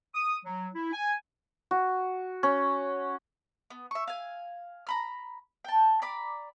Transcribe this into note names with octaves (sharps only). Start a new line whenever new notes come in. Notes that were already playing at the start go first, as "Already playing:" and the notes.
D#6
F#3
E4
G#5
F#4
C#4
B3
E5 C#6
F5 G#5
A#5 B5 F6
G5 A5
D5 A#5 B5 D6